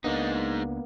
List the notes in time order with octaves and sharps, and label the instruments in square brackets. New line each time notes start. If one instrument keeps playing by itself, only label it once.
[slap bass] C#2 D4 [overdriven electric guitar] G#3 D#4 [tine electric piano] A#3 B3